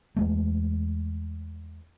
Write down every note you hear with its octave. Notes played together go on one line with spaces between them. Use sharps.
E2 G#3 A3